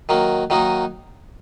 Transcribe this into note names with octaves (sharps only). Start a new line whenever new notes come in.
D#3 F#3 A#3
D#3 F#3 A#3 D#4